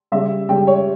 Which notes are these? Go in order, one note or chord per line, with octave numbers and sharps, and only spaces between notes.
C#3 G3 E5
C#3 G3 G5
C#5